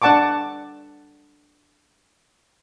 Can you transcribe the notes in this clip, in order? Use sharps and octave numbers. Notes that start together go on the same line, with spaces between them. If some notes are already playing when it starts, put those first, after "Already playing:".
D4 D5 F#5 A5 C#6 D6